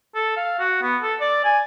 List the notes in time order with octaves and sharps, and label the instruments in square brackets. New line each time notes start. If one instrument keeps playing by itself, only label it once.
[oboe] A4
F5
F#4
B3
A4
D5
G#5